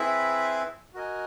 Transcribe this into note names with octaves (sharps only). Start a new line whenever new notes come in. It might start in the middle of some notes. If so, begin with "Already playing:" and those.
Already playing: C4 E4 G#4 B4 E5
F#4 A#4 D#5 G#5